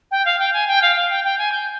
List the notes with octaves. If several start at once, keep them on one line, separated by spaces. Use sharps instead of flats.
G5
F5
G5
G#5
G5
F5
F5
G5
G5
G#5
G6